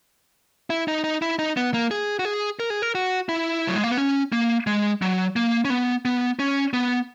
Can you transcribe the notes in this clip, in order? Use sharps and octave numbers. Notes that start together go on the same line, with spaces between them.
E4
D#4
D#4
E4
D#4
B3
A#3
G#4
F#4
G#4
A#4
G#4
A#4
F#4
E4
F#3
G#3
A#3
B3
C#4
A#3
G#3
F#3
A#3
C#4
B3
B3
C#4
B3